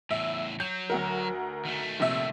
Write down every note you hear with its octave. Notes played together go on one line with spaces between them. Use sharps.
E2 A2 E5
F#3 G6
D2 F#4 A#4
D#3 A3
A#1 C3 E5